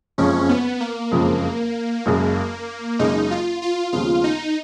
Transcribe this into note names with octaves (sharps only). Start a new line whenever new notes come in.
F#1 F2 C#3 F3 G#3 C#4
B3
A#3
F#1 F2 C#3 F3 G#3
F#1 F#2 C#3 G#3
F#1 F#2 C#3 G#3 D#4
F4
F4
D#2 C#3 F3 G#3 B3 F4
D#4